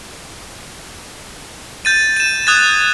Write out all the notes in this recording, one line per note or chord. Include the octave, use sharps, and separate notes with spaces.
G6 A6 D#7
D#7 E7
D#6 F#6 G#6 A6